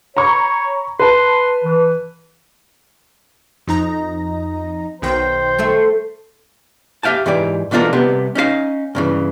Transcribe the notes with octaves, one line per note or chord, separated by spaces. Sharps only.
C#5 A#5 B5 C#6
B4 A5 C6
E3
F2 D#4 A#5
B1 D#3 C5 G5
A3 A4 E5
G4 E5 F5 G5 A5
G#2 E3 G4 D5
B1 E3 D4 F4 A4 A#4
C2 C3 B3 G4
C#4 D#4 F#4 F5
G2 C#3 E3